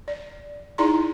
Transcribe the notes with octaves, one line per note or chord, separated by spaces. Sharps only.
D5
D#4 E4 G#4 D5 A#5 C6